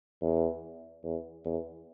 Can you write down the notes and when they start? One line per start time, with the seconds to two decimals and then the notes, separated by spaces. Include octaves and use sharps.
0.22 E2
1.04 E2
1.45 E2